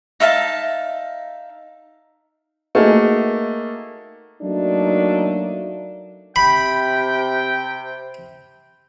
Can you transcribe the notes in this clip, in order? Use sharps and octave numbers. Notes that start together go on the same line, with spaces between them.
D#4 E5 F5 A5
A3 A#3 D#4 F#4 G#4 A#4
F#3 A3 A#3 D4 D#4
C3 G5 B5